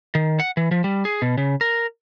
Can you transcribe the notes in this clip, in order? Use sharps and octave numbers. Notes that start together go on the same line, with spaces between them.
D#3
F#5
E3
F3
G3
G#4
B2
C#3
A#4